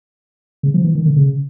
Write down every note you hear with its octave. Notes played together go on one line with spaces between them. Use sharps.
C#3
F3
E3
D#3
D3
C#3